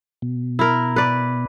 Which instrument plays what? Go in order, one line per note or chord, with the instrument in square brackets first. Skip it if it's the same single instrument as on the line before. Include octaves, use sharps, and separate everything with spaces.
[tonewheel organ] B2
[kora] E4 A#4
B4 D5